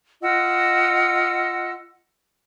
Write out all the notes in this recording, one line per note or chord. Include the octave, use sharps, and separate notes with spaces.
F4 D#5 F#5 E6